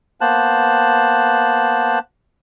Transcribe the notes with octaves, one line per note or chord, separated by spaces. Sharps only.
A#3 B3 C5 A5 F#6